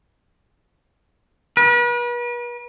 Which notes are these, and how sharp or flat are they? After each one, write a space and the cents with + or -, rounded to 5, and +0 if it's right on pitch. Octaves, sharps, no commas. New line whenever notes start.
B4 -40